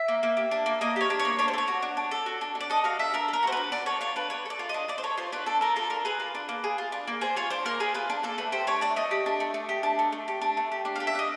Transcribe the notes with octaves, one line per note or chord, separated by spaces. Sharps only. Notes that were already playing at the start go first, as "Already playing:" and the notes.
Already playing: E5
A#3
A#3
G4
D4
A#3
A#3 D#5
G4 C#5
D4
C#5
A#3
D4 C#5
C5
A4
C#5
F#4
D4
D4
A4
F#4
D4
D4
D5
A4 D#5
F#4 F5
D4 E5
D4 A#4
A4
A#4
F#4 C5
D4 B4
D4 D5
A4 C#5
F4 C#5
D4 B4
D4 C#5
A4 D5
F4
D4 D#5
D4 D5
C5
A4 C#5
F4 C5
D4 B4
D4 A4
A4 A#4
F4 A4
D4 A#4
G#4 B4
F4
D4
A#3
G#4
F4
D4
A#3
G#4 C5
F4 C#5
D4 C5
A#3 A#4
G#4 B4
F4 B4
D4
A#3 A4
A3 B4
G4 C5
D4 C#5
A3 D5
A3 D#5
G4
D4
A3
A3
G4
D4
A3
A3
G4
D4
A3
G4
D4
G4 F5
E5
D4 D#5